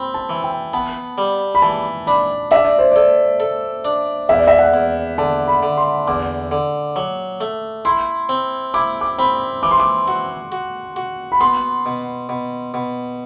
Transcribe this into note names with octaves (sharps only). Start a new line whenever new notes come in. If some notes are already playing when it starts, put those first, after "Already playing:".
Already playing: C4 G5 B5
A5
E3
G5
B3 A5
G3
B5
E3 A5
D4 B5
D4 E5
D5
C5
A4 D5
A4
D4
E2 E5
D5
E5
F#5
E2
D3 A5
B5
D3
C6
E2 D6
D3
F#3 D6
A3
E4 C6
C4
E4 D6
D6
C4 B5
E3 D6
C6
D6
F#4
F#4
F#4
B5
B3 C6
B2
B2
B2